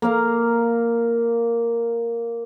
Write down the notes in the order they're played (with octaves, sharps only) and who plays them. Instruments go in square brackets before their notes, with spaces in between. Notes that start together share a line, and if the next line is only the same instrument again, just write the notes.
[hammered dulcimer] A#3 A#4 F5 A#5